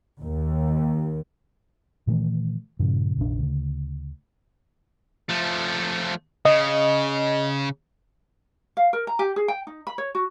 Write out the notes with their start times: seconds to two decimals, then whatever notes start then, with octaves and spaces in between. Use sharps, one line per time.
0.21 D#2
2.07 A#2 D#3 E3 A3
2.80 G2 A#2 C#3 F3
3.17 F1 A#1 D#3 D4
3.39 D2 C#3
5.29 F3 A3
6.45 C#3 D#5
8.77 F5
8.93 A#4
9.07 A#5
9.19 G4
9.36 G#4
9.48 G5
9.67 D#4
9.87 B5
9.98 C#5
10.15 F#4